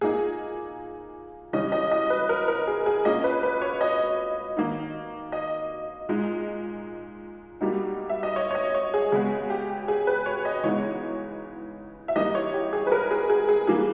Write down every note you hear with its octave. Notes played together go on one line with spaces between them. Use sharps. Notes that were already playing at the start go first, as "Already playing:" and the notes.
A#2 A#3 D#4 G#4
C#3 E3 G3 C#4 D#5
D#5
D#5
B4
A#4
A#4
G#4
G#4
A#2 A#3 C#4 D#5
B4
B4
C#5
D#5
D#3 A#3 D#4
D#5
A#2 G#3 D#4
B2 G3 A#3 D#4
E5
D#5
C#5
C#5
D#5
C#5
G#4
C#3 G#3 B3 G#4
G4
G#4
B4
C#5
D#5
C#3 E3 G#3 B3 D#4 C#5
E5
E3 G3 A#3 D#4 D#5
C#5
G4
G#4
B4
A#4
G#4
G#4
G#4
E3 G3 A#3 G#4